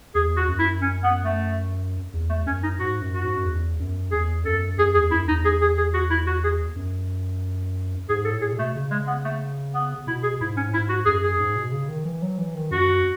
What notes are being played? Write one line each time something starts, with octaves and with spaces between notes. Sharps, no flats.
E2 G#4
F#4
F#2
E4
C#4
B3
A3
E2
A3
F#2 C#4
D#4
G#2 F#4
F#2
F#4
G#2
F#2
E2
F#2
E2 G#4
F#2 A4
F#2 G#4
E2 G#4
F#2 E4
E2 D#4
G#4
G#4
G#4
F#4
E4
F#4
G#4
F#2
G#2 G#4
A4
A2
G#4
B2
A3
C#3
G#3
B3
A3
B3
B2 E4
G#4
G#2 E4
C#4
A2
G#2 E4
F#4
F#2 G#4
G#4
G#2
B2
C#3
D#3
E3
F#3
E3
D#3
F#2 F#4